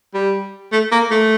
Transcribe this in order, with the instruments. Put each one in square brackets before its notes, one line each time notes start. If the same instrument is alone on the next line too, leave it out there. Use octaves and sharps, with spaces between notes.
[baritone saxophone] G3
A3
A#3
A3